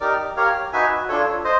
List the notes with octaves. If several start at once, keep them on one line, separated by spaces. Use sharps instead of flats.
D#4 G4 A#4 D5
G4 A#4 C#5 F5
D#4 F#4 B4 E5 G#5
D4 F4 A4 C#5
C5 D#5